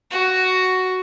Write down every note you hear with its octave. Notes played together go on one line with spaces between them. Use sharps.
F#4